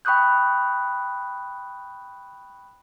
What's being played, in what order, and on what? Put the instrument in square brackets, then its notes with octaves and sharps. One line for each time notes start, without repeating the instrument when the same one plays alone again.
[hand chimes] G5 B5 C#6 D#6 F#6 G6